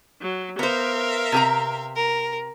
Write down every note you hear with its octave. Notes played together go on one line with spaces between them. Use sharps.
F#3
B3 A#4 C5 E5 F5
C3 G4 A#5
A#4